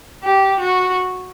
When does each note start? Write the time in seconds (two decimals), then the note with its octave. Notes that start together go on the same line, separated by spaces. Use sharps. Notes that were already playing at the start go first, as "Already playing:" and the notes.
0.23 G4
0.60 F#4